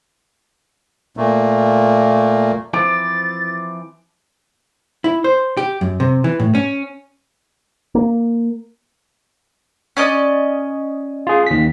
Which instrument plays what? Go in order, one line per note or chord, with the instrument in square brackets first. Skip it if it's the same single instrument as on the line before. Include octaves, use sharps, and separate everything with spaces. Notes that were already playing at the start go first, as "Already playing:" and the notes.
[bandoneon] A#2 A3 A#3
[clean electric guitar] E3 F3 C4 [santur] D6 [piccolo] A6
[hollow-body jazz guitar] E4
C5
G4
F#2
C3
E3
A2
C#4
[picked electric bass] A#3
[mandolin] C#4 D5 D#5
[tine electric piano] F4 G#4
D#2 B6